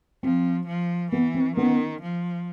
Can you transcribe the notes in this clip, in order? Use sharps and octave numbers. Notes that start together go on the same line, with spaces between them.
F3 C4
F3
E3 B3
C4
D#3 B3 C#4
F3